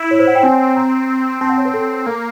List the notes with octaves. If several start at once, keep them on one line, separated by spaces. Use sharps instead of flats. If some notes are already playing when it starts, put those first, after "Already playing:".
Already playing: E4
C#5
C5
F#5
G5
C4 G#5
A#5
C4 A5
F#5
C#5
B4
A4
A#3 A#4